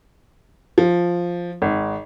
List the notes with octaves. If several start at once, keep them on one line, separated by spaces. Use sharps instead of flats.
F3
G#1